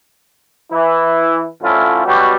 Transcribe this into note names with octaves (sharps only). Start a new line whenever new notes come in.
E3 E4
A2 D3 F3 C#4 E4 F4
B2 F#3 G3 F#4 G4